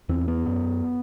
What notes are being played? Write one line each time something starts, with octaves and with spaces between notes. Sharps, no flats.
E2 C4
B3
F#2